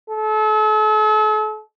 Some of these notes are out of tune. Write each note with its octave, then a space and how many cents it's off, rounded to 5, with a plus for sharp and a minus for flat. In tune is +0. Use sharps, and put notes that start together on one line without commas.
A4 -40